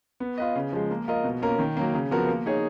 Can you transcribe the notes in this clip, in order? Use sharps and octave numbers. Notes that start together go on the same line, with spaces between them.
B3
F4 B4 D#5
C#3
F3 G#3
A#3
F4 A#4 D#5
B2
A#3 C#4 F4 A#4
D#3
F#3 A#3
C#3
F3 B3 F#4 A#4
A#3
D#4 G#4 C#5